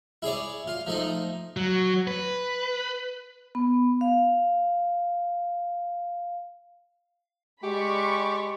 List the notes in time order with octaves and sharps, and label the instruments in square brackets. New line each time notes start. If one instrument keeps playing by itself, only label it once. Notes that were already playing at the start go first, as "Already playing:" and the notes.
[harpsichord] E4 G#4 C#5 D5
F4
F3 A3 D#4
[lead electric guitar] F#3
B4
[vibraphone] B3
F5
[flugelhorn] G#3 [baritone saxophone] G4 [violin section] D5 B5 C#6